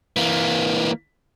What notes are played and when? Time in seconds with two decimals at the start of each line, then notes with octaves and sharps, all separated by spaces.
0.16 E3 A#3